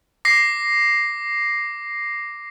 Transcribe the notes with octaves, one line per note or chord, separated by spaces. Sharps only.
D6 A#6 C7